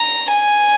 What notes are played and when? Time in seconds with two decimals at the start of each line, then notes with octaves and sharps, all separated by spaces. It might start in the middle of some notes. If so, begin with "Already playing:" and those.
Already playing: A#5
0.33 G#5